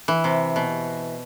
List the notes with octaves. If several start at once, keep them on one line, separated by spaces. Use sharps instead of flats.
E3
C3
B2